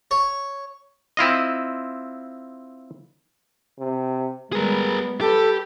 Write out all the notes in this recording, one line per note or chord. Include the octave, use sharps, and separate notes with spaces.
C#5
C4 E4 F4 D#5
C3
G3 G#3 B3 G#4 A#4
G4 A4 B4